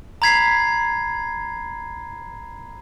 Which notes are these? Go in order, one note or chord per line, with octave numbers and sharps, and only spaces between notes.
A#5 B5 G#6 B6 C7